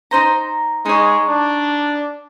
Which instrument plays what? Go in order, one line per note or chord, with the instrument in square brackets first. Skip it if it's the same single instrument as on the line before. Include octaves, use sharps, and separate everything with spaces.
[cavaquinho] D#4 C5 A#5
[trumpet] G#3 [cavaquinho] D#4 C#5
[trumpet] D4